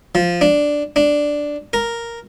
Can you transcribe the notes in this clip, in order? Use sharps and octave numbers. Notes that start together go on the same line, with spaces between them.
F3
D4
D4
A#4